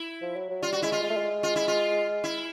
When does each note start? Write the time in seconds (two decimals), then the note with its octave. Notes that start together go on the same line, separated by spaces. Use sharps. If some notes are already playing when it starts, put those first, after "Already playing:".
Already playing: E4
0.22 F3
0.36 F#3
0.49 F#3
0.63 G3 F4
0.73 F#4
0.82 G#3 E4
0.92 F4
1.03 G#3
1.10 A3
1.17 G#3
1.43 F4
1.56 E4
1.68 F4
2.24 E4